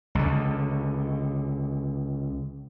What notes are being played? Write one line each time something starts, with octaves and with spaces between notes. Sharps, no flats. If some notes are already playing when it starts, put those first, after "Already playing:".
C#2 D3